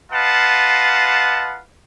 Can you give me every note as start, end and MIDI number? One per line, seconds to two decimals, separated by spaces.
0.12 1.60 65
0.12 1.60 71
0.12 1.60 75
0.12 1.60 77
0.12 1.60 78
0.12 1.60 81